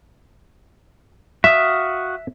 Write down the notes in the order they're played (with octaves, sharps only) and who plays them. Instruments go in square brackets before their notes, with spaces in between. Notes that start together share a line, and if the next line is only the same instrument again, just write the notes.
[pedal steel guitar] F#4 F5 D#6 [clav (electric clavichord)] E5